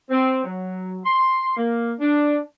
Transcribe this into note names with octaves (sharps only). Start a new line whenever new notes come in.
C4
F#3
C6
A#3
D4